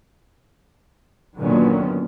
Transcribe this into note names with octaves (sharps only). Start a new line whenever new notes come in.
A#2 D3 D#3 F#3 B3 C#4